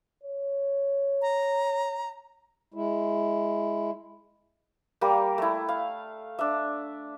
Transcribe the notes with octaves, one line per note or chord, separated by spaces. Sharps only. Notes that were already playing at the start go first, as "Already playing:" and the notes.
C#5
A#5
G#3 E4
G3 A#3 A#4
A3 E4
F5
D4 E5